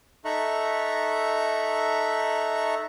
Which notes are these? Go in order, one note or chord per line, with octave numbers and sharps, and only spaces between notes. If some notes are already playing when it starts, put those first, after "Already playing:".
D#4 A4 E5 A#5 C#6 F#6